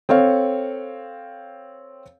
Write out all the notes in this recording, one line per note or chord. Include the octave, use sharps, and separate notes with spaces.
C4 A4 C#5 F5